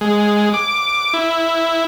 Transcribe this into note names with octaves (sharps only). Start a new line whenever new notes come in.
G#3
D6
E4